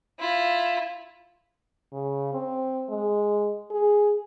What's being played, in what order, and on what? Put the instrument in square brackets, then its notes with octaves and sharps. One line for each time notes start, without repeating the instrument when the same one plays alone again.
[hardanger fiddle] E4 F4
[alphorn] C#3
C4
G#3
G#4